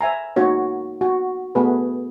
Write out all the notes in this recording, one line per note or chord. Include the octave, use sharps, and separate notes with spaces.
C5 E5 G#5 A#5
A#3 D#4 F#4 C#5
F#4
A3 B3 F#4 G#4 B4